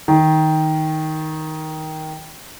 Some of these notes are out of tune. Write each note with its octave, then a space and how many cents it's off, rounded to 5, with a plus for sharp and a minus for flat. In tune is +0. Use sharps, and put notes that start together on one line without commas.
D#3 +10